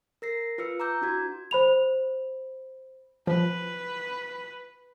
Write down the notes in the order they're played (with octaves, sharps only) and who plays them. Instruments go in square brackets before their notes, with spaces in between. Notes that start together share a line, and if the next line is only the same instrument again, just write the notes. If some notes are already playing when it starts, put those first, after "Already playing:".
[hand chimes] A#4 A#6 C7
F4 B4 E6 C#7
A#5 D6 E6 G6
D4 E4 F#4 G#6
[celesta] C5 B5 F7
[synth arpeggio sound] F3 [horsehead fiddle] B4